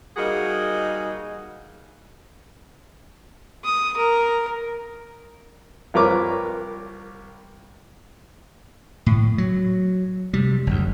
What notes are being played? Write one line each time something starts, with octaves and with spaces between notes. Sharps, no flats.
G3 A#3 D#4 F#4 G#4 A#4
D#6
A#4
C2 F3 A#4 B4 C#5 D6
A2
F#3
C3 G3
F#1 D2